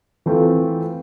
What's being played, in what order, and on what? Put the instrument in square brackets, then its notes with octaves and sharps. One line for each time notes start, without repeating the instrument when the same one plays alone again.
[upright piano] E3 A3 C4 F4